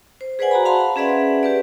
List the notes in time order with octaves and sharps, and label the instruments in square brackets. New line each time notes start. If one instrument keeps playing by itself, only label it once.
[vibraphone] C5
G#4 B4 C5 D5 F#5 G#5
F#4 A#5 B5
F5 F#5 A5 B5 C6
C#4 G#4 B4 D5 E5 F#5
G4 B4 D5